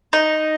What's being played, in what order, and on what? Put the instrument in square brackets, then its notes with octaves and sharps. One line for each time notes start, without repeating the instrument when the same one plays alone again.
[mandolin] D#4